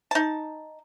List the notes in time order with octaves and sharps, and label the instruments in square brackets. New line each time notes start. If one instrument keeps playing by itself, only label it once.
[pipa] D#4 A5